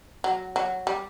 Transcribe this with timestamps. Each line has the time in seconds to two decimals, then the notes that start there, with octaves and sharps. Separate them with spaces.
0.24 F#3
0.56 F#3
0.87 G3